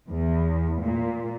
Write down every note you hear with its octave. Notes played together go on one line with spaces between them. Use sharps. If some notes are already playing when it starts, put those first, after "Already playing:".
E2
A#2